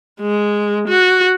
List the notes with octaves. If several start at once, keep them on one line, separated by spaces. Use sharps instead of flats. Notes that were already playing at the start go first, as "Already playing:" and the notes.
G#3
F#4